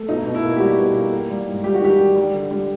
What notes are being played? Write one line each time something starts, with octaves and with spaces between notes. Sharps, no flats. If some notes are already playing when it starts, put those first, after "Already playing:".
Already playing: A3
B2 D#4
B2
E4
A#3
G4
G3 F#4
B2
A#3
A#3
G3
G#2
G3 G4
F#4
D#3 G4
G3
G3
D3
G3